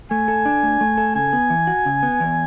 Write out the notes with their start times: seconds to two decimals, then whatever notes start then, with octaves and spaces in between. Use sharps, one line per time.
0.11 A3 G#5
0.28 A4
0.45 D4
0.63 A3
0.81 A3
0.98 A4
1.15 C#3 G#5
1.33 B3
1.50 E3
1.67 F#4
1.86 C#3
2.03 B3
2.20 E2